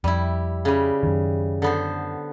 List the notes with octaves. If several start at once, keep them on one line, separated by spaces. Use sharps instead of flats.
F2 G3 E4
C#3 G3
F#2 D#3
D3 B3 C5